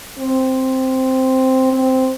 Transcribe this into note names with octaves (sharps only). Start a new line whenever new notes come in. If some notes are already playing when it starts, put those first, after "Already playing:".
C4
C4